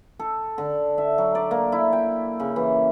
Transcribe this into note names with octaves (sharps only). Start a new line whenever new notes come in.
A4
D3
E5
F#3
D5
A#3
E4
G5
C#3
E3